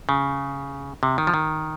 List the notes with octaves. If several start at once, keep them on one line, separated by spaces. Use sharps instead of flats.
C#3
C3
D#3
F3
D#3